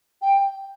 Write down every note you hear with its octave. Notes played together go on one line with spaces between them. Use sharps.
G5